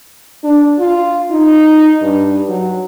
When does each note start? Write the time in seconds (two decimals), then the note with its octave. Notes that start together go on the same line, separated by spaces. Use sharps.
0.44 D4
0.79 F4
1.31 D#4
2.02 G2
2.49 F#3